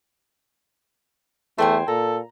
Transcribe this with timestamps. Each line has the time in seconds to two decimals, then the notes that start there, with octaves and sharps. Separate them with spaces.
1.58 E2 A3 C5 G5 G#5
1.88 A#2 A4 A#5